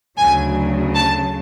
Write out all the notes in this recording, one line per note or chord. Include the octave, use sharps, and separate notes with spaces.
D2 C#3 F#3 G#5
A5